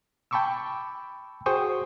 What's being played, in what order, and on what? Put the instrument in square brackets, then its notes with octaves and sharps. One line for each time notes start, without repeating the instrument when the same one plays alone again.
[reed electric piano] G5 A5 B5 C#6 D6 E6
F#4 G#4 C5 G5 C#6 D#6